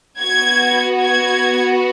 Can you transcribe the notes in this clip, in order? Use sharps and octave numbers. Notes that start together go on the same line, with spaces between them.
B3 F#4 G#6
G#6